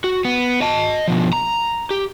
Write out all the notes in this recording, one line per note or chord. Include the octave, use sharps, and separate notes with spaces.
F#4
B3
D#5 A5
B2 F3
A#5
G4